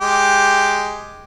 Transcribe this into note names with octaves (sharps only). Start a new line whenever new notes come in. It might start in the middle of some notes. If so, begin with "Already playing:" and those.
G#3 G4